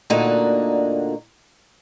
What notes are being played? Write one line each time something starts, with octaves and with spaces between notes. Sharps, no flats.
D2 A#2 D3 A#3 D#4 F#4